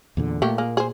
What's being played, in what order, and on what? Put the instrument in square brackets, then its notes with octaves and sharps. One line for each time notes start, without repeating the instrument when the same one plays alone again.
[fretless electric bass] E2 A#2 D3
[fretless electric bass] A#2 [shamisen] A3 A#3 G4
[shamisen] A#3 G#4
G#4 C5